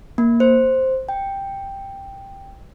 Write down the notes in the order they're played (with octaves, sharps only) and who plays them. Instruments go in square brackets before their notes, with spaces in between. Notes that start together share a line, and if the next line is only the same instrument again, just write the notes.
[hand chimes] A#3
C5
G5